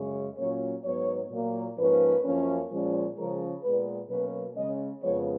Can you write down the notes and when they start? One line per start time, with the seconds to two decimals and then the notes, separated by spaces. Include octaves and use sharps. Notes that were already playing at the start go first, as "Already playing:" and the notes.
Already playing: F#2 C#3 G#3 C#4
0.38 A#2 F#3 A#3 C#4 C#5
0.84 G#2 F#3 B3 C#5
1.32 A#2 F#3 A#3
1.77 G#2 F3 A#3 C#4 B4
2.25 F#2 F3 A#3 C#4
2.70 A#2 F3 G#3 C#4
3.17 C#3 F3 G#3 C#4 A#4
3.63 A#2 G#3 B3 B4
4.09 B2 F#3 A#3 C#4 B4
4.56 C#3 G#3 C#4 D#5
5.02 F2 C#3 F3 G#3 B3 C#5